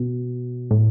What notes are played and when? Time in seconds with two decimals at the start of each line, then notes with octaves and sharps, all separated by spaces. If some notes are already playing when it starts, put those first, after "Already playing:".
Already playing: B2
0.71 A2